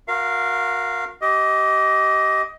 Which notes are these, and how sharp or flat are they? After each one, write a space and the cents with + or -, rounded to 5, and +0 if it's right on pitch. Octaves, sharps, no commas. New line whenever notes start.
F#4 -35 A#4 +0 F5 -15
G4 -20 D#5 +15